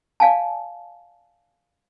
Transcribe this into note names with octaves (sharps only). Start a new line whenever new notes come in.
D5 F5 G#5 A5